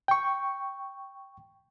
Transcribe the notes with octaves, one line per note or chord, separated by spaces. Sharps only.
G5 C#6